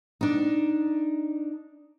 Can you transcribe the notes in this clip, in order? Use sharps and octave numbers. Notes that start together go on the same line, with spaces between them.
D4 D#4